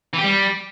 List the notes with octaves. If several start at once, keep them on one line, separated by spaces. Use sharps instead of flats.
E3
G4
G3